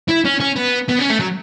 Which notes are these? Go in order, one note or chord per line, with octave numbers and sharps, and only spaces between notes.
E4
C#4
C#4
B3
B3
C#4
A3
F#3